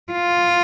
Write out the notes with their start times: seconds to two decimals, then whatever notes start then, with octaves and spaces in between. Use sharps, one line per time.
0.13 F4